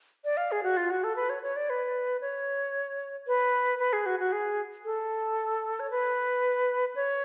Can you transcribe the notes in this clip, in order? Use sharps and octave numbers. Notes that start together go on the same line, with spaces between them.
D5
F5
G#4
F#4
F4
F#4
A4
B4
C#5
C#5
D5
B4
C#5
B4
B4
G#4
F#4
F#4
G#4
A4
C#5
B4
C#5